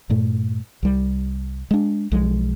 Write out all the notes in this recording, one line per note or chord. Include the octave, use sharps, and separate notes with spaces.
G2 A#2 A3
C2 G3
G#3 D4
B1 F3 G#3